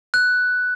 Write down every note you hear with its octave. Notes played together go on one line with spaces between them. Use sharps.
F#6